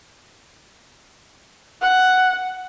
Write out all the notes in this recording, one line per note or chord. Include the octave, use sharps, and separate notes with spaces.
F#5